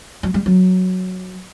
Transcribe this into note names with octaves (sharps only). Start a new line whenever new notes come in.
F#3
G3
F#3